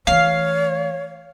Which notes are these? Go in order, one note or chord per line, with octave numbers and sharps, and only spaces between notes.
E3 A3 C#5 F5